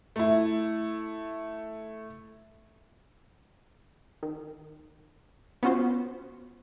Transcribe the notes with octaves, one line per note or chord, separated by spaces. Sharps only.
A3 E4
D#3
B3 C#4 F4 F#4 C5